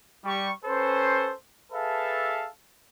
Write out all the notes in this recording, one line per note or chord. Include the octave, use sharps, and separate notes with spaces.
G3 G4 C#6
C#4 A4 B4 C5
G#4 A4 B4 E5 F5 A5